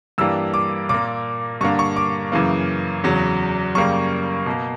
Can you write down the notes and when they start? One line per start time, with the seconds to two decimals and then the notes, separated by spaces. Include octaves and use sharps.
0.18 G2 E3 G3 A#3 E6
0.54 D6
0.89 A#2 A#3 D6
1.61 G2 D3 A#3 C#6
1.79 C#6
1.96 D6
2.32 F#2 C#3 E3 A#3
3.04 E2 C#3 F#3
3.75 F#2 C#3 G3 A#3 C#6
4.46 B2 A#3